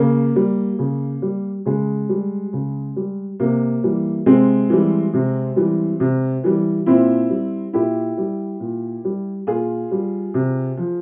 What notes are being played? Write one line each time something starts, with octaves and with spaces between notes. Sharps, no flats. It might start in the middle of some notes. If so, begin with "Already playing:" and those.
Already playing: C#3 A#3
G3
C#3
G3
C#3 G#3
G3
C#3
G3
C3 A#3
E3 G3
C3 G#3 C4
E3 G3
C3
E3 G3
C3
E3 G3
A#2 C4 E4
G3
A#2 E4 G4
G3
A#2
G3
A#2 F4 G#4
G3
C3
F3